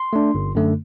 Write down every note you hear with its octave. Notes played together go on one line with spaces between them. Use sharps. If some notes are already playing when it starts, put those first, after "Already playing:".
Already playing: C6
A3 D4
G1
F#2 D3 A3